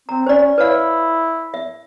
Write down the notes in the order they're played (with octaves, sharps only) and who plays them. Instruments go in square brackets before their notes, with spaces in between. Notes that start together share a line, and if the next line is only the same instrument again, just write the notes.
[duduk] C4 [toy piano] A#5
[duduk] C#4 [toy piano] C5 D5
[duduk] E4 [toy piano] B4 C#5 F5
[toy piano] E5